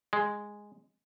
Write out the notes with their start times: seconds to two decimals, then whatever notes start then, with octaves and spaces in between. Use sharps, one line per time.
0.13 G#3